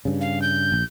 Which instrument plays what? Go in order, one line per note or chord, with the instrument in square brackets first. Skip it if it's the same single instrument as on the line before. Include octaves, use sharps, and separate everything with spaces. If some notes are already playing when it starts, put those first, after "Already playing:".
[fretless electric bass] G2 C#3
[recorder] F5
G6
[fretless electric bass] A#1